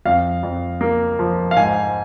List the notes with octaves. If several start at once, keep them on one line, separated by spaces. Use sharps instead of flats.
F2 F5
F2
A#3
F3
F5
G#2 G#5